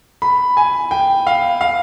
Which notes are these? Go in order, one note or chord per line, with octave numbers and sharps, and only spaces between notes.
B5
G#5
G5
F5
F5